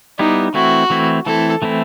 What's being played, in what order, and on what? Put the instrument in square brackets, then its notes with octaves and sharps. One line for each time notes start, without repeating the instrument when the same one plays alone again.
[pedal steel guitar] G3 B3 E4 G4 [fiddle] D#4
[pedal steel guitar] E3 A3 C4 E4 [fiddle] F#4
[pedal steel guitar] E3 A3 C4 E4
[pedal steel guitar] E3 A3 C4 E4 [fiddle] A4
[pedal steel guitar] E3 A3 C4 E4